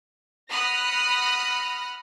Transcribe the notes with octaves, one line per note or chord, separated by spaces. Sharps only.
F#5 B5 D#6 F6 F#6 A#6